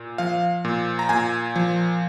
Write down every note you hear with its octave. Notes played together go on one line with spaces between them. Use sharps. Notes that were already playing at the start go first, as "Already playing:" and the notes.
Already playing: A#2
F3 F5
A#2
A#5
A#2 G#5
F3